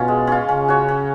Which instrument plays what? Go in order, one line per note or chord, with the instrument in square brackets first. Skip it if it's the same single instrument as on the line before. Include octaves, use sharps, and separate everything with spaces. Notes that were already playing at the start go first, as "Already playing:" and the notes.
Already playing: [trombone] B2 [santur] C#4 F4
[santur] G#3
C#4 F4
[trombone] C#3 [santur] C#4
[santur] F#4 C#5
C#4